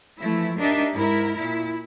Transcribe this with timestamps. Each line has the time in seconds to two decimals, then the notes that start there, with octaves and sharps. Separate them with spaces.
0.19 E3 F3 A3 E4
0.59 D4 D#4 G4 A#4 D#5 E5
0.94 G#2 E4 A#4
1.36 A#2 E4